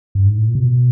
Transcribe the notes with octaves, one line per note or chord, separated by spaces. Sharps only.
G2
G#2
A2
A#2
C3
B2